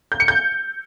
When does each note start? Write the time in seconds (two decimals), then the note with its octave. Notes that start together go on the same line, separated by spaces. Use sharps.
0.12 G6
0.20 C#7
0.28 G6